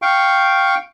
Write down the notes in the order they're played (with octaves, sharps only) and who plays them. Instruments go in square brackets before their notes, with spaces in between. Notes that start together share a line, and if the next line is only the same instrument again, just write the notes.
[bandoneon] F5 G5 C#6